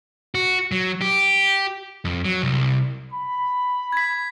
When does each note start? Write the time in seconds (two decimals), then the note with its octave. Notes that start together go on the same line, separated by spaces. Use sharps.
0.35 F#4
0.72 F#3
1.01 G4
2.05 F2
2.25 F#3
2.42 C2
3.12 B5
3.92 G#6 B6